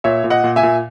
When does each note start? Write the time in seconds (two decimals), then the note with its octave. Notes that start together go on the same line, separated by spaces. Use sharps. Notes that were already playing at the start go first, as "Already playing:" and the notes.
0.04 A#2 C#5 E5
0.24 A#2
0.30 D#5 F#5
0.44 A#2
0.56 E5 G#5
0.63 A#2